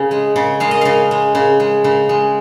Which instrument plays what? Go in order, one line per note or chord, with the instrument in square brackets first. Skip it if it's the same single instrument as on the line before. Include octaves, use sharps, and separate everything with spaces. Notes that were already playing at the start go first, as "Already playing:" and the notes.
Already playing: [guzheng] C#3
G#3
C#3
G#3 F5
D#5
C#3 F5
G#3
C#3
G#3
C#3
G#3